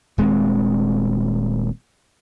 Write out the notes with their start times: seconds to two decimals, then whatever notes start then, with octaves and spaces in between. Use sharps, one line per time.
0.18 D#1 G#3 C4